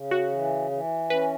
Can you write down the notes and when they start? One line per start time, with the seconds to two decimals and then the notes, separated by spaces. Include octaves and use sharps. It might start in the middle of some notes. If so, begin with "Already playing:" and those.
Already playing: C#3
0.11 F#4
0.31 E3
0.71 E3
1.10 C#4 B4